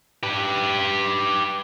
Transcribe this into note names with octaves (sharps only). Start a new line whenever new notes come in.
G4 B4